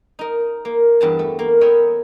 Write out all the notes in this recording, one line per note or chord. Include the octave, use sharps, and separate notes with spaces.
D#4 A#4
A#3
E2 G2 A5
A3
A#3
A#4 C#5 D#5 E5 G5 B5